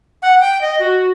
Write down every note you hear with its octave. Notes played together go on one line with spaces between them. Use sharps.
F#5
G5
D#5
F#4